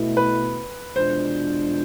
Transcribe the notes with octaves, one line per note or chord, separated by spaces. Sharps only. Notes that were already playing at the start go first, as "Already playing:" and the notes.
Already playing: B2 A3 E4
B4
E2 B2 G#3 D4 F4 C5